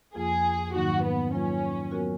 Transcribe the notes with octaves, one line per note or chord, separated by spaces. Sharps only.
F2 F3 A#3 F4 G#4
G#2 D#3 F#3 A#3 D#4 F#4
B3
F#3 A#3 C#4 F4 B4
F#3 B3 F#4 A#4